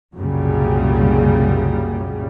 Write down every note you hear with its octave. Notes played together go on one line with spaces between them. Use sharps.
C2 F#2 A#2 C#3 G3